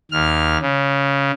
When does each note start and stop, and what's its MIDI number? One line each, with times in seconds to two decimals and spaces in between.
0.12 0.57 39
0.12 0.57 89
0.61 1.31 49